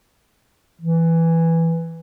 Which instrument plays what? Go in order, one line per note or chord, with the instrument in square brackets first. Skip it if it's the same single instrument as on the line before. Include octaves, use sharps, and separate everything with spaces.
[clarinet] E3